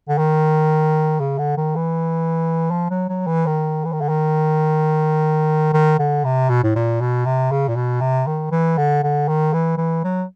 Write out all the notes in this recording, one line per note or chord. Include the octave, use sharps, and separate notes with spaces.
D3
D#3
C#3
D3
D#3
E3
F3
F#3
F#3
E3
D#3
E3
D#3
D3
D#3
D#3
D3
C3
B2
A2
A#2
B2
C3
C#3
A#2
B2
C3
D#3
E3
D3
D3
D#3
E3
E3
F#3